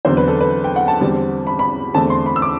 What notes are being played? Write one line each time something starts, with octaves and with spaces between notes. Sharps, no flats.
E2 D3 F#3 C4 C5
B4
A4
B4
G5
F#5
A5
E2 D3 G3 C4
B5
B5
E2 D3 A3 C4 A5
C6
B5
E6
D6